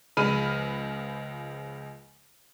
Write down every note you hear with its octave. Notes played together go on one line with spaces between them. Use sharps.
C#2 F3 G#3 B5 F6 D#7